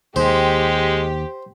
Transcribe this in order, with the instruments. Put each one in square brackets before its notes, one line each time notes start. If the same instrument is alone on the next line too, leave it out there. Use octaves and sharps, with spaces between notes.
[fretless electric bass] D#2 [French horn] G#3 [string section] G4 [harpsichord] C5